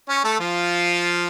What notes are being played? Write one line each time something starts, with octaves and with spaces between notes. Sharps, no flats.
C#4 C#5
A3 A4
F3 F4